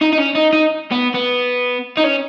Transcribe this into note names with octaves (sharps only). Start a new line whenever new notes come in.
D#4
D#4
C#4
D#4
D#4
B3
B3
D#4
C#4